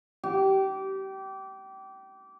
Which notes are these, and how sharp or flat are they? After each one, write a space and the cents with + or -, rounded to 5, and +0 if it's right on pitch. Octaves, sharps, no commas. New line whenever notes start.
G4 -25